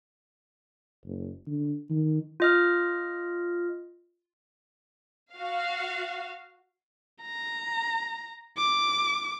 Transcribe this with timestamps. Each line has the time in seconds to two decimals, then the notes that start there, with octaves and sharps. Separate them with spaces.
1.05 F#1
1.46 D3
1.90 D#3
2.40 F4 D#5 F6
5.34 F#4 F5
7.21 A#5
8.57 D6